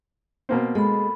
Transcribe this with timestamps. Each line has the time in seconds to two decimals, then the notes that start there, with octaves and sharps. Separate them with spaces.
0.49 B2 A#3 C4
0.75 G#3 A4 B5